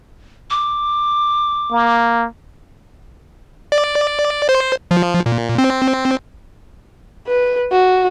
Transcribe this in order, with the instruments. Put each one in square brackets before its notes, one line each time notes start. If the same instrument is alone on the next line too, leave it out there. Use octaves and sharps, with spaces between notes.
[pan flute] D6
[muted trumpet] A#3
[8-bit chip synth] D5
C5
F3
A#2
C4
[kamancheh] B4
F#4